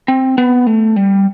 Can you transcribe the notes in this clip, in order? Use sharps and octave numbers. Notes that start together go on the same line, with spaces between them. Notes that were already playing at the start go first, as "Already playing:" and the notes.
C4
B3
A3
G3